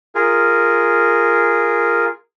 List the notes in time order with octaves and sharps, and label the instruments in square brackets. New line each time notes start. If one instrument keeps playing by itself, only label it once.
[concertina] F4 G#4 A#4